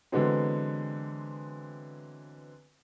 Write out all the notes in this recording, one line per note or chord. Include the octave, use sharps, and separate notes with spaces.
D3 E3 F#3 G#3 B3 C4